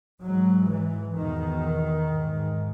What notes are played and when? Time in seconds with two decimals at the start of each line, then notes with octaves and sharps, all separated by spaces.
0.22 G#2 F#3
0.69 E3
1.16 E2 B2 D#3
2.11 G#2